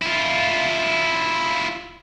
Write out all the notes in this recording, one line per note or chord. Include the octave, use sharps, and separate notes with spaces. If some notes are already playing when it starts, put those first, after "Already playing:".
E4 F4